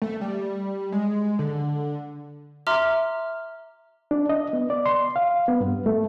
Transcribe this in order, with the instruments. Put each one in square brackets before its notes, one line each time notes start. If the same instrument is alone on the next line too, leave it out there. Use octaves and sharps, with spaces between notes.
[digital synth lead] A3
G3
G#3
D3
[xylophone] E5 A#5 C6 D6 F6
[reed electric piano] D4
D#5
B3
D5
C6
F5
B3
G2
A3